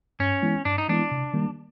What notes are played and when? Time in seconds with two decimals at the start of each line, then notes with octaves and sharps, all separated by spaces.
0.20 G2 C#4
0.42 E3 G#3 B3 E4
0.65 G2 D4
0.78 D#4
0.88 E3 G#3 B3 D4 E4
1.11 C3
1.34 D#3 G3 A#3